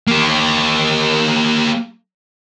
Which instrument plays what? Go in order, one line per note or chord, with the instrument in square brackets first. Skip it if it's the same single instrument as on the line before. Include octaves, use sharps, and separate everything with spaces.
[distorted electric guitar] A#3 G4